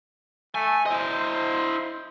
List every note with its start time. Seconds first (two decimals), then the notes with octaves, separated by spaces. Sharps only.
0.55 A3 G#5
0.86 E4 C5 D#5